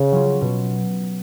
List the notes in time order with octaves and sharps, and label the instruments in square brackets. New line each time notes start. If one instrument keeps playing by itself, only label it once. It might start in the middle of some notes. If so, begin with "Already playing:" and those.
Already playing: [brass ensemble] C#3
[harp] F#3 C#4 F4
B2